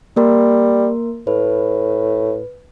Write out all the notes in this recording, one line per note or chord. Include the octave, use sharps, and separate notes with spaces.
G3 A#3 A#4 C6
A2 B4